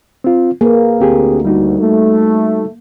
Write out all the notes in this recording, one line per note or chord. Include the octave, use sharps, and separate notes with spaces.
C4 F4
A#3 G#4 B4
D2 C4 G4 G#4
G3 D#4 F#4
A3